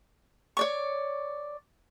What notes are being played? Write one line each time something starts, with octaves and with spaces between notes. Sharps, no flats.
C#5 D5 C#6